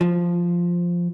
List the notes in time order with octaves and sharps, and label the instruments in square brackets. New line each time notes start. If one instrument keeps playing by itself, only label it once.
[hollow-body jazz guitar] F3